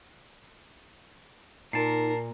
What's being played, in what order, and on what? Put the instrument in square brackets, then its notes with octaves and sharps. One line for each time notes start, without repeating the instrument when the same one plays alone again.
[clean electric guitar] A#2 [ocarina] D#4 [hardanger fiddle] A#4 [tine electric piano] A5 C7